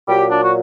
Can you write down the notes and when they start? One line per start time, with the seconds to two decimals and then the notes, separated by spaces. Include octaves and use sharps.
0.08 A#2 F#3 G4
0.30 D4
0.44 F#4